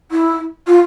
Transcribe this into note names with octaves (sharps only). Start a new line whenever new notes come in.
E4
F4